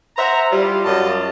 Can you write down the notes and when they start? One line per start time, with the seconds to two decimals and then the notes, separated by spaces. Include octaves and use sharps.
0.17 C5 E5 F#5 A#5
0.51 G3 E4 F4
0.84 F#2 G3 F4 F#4 D#5 A5